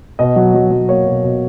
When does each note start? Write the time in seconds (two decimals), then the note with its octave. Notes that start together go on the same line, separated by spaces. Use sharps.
0.19 B2 D#5
0.36 F#3
0.54 F#3
0.71 F#3
0.89 A#3 C#5
1.06 B2
1.24 B2